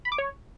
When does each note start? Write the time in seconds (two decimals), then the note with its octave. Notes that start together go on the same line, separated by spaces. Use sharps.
0.05 B5
0.12 D6
0.18 C#5